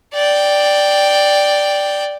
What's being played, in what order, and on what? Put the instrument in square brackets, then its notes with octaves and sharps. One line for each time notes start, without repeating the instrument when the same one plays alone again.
[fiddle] D5 G5